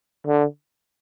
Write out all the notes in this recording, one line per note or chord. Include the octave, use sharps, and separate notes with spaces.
D3